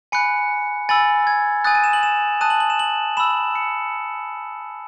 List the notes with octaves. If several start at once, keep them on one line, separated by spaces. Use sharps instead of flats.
G#5 B5 F#6 C#7
G#5 B5 E6 A6
G#6
G#5 D#6 F#6 A6
D#7
E7
F#7
E7
A5 D#6 F#6 D#7
F#7
F#7
E7
F#7
B5 E6 E7
C#7